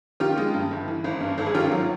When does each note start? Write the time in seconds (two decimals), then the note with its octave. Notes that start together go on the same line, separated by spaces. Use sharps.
0.20 D#3 F4 G4
0.38 G#3
0.54 G2
0.71 G1
0.88 E3
1.04 G#1
1.20 G2
1.38 G#1 A4
1.46 G#4
1.54 D#3 F4 G4
1.72 F#3